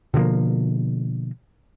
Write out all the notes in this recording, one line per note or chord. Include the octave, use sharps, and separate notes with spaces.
B2 D3 F3 A#3